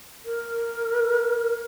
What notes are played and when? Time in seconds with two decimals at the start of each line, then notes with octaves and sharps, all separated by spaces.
0.25 A#4